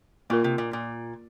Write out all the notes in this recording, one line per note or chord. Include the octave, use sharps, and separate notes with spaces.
A#2 A#3 F4 A#4
C3
A#2
A#2